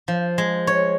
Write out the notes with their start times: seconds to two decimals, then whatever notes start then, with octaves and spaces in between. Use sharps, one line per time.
0.08 F3
0.38 G#3
0.67 C#5